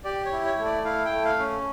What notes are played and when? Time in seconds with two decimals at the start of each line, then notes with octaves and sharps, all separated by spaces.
0.04 G4 D5
0.25 C#5
0.32 E4
0.45 C#5
0.59 A3
0.65 D5
0.85 E4 F5
1.05 G5
1.12 A3
1.25 F5
1.39 C#4